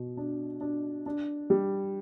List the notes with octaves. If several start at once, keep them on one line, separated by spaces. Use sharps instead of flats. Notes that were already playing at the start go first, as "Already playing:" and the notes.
Already playing: B2
D4
D4
D4
G3